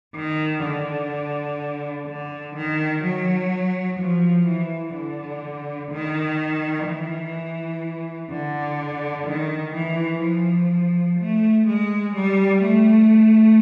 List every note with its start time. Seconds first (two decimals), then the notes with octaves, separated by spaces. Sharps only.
0.15 D#3
0.63 D3
2.07 D3
2.55 D#3
3.04 F#3
3.99 F3
4.47 E3
4.95 D3
5.91 D#3
6.87 E3
8.31 D3
9.27 D#3
9.74 E3
10.23 F3
11.19 A3
11.67 G#3
12.15 G3
12.63 A3